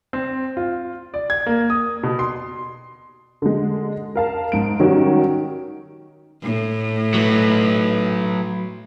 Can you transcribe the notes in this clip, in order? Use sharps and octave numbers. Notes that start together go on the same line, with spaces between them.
C4
F4
D5
G#6
A#3
D#6
B2
C6
D3 G#3
A#4 F5 A5
G#2 D7
D#3 F#3 G3 C#4 F#4
A2
F#3 B4